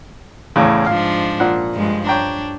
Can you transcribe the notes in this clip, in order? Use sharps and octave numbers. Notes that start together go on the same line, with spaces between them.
E2 A2 C#3
G#2 F3 D4 F5
A#2 F#5
G2 F3 G#3
D4 C#5 G5 A#5